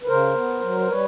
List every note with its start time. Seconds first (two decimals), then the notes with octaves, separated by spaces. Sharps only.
0.03 B4
0.07 C#3 A#4 C5
0.34 B3
0.61 F#3
0.80 C5
0.88 G3 B4 C#5